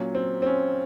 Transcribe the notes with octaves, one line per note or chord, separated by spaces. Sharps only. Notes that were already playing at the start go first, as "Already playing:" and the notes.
Already playing: A#2 F#3 C#4
C4
C4
C#4